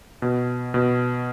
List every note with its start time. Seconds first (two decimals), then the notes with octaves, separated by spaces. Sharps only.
0.22 B2
0.74 B2